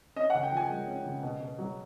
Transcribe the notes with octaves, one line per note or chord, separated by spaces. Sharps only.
C#4 D#5
F#5
C#3
G5
F3 G#5
G#3
C#4
C#3
B2
B2
F#3